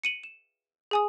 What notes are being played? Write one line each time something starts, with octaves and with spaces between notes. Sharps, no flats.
C#7 D#7 F#7
E7
G#4 G#5 D#6